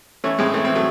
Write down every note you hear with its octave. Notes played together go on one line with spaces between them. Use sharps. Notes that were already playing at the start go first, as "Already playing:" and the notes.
E3 A3 C#4
A2 G#3 C4
E3 A3
E3 C4
F#3 A3